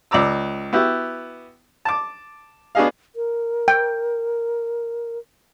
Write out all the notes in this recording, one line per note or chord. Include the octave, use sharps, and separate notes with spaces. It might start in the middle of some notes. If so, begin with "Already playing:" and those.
C#2 D5 A#5 D6 E6
B3 E4 F#4 G4
A5 D6
B3 D4 F#4 G#4 D#5 F5
A#4
G5